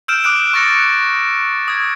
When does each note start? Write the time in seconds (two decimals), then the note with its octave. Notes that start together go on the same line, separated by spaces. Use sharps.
0.08 E6 F6 G6 D7 E7
0.24 D6 D#6 F6 F#6 D7 E7
0.53 C#6 F#6 A6 A#6 C#7 E7
1.68 D#6 G#6